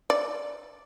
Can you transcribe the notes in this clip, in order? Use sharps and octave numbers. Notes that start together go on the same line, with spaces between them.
D5